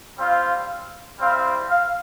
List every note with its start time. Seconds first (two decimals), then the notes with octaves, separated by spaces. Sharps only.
0.18 G3 C4 F4 F5
1.19 G3 C4 E4 F5
1.70 F5